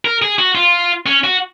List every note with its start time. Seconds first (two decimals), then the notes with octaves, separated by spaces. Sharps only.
0.05 A#4
0.22 G#4
0.38 F#4
0.55 F4
1.06 C#4
1.24 F#4